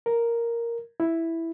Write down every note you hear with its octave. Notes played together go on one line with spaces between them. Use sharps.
A#4
E4